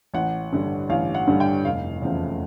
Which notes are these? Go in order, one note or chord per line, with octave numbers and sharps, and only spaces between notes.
A1 F#5
G2 D3 G3
A1 F5
F#5
G2 D3 G3
G5
F1 F5
E2 C#3 F3 A3